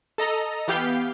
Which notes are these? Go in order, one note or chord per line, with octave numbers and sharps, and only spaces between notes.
A4 D#5 A#5
E3 B3 G4 F5 G6